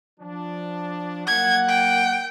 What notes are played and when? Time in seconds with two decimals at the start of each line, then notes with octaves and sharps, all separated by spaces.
0.20 F3 D4
1.27 F#3 A#3 F#5 G#6
1.69 G5